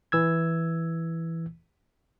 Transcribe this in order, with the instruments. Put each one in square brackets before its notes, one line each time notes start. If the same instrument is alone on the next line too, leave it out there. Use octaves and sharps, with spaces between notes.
[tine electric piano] E3 E6 G#6